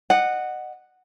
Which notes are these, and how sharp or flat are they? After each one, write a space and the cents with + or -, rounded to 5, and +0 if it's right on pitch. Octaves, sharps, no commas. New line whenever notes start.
D#5 -30 F#5 +0